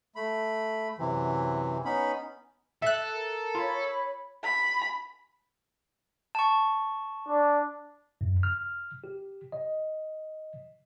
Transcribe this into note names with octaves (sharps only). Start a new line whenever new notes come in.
A3 B5
F#2 C3 E3
B3 C#4 D#4 B5
A4 E5 F#6
A#4
F4 C#5 B5
B5
A5 C#6
D4
F#2
F6
G4
D#5